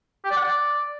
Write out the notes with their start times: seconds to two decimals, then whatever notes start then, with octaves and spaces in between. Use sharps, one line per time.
0.24 G4
0.30 D5
0.37 F#5
0.43 D5